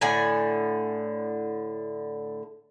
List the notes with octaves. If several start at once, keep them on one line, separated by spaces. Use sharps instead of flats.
A2 D3 G#5